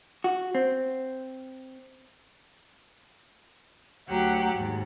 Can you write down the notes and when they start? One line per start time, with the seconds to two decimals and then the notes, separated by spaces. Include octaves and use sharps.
0.24 F#4
0.55 C4
4.08 D2 F#3 G4 F#5
4.54 D#2 G#2